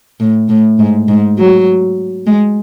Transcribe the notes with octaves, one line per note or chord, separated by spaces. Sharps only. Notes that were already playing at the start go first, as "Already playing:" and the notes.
A2
A2
G#2
G#2
F#3
G#3